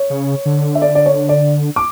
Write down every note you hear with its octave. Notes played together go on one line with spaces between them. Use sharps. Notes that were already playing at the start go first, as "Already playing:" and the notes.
Already playing: C#5
C#3
D3
E5
D5
D5
C#5
D5
D6